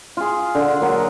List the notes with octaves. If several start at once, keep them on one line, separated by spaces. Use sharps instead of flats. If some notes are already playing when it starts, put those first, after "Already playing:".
F4 G#4
D3
F#3 A#3